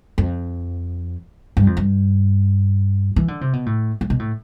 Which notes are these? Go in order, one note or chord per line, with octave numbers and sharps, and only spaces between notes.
F2
G2
F2
G2
E3
D3
C3
B2
A2
A2
B2
A2